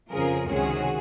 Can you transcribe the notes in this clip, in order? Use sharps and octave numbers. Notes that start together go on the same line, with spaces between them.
F2 C#3 F3 G#4 A#4
C#2 C3 D#3 G#3 C#4 F#4 G#4